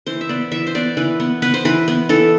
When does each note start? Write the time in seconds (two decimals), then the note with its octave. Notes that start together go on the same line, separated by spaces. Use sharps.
0.07 E3 C5
0.21 E5
0.29 B3 D5
0.51 E3 E5
0.67 C5
0.75 B3 D5
0.97 E3 B4
1.20 B3
1.42 B3 B4
1.54 C5
1.65 E3 B4
1.88 B3
2.09 E3 A4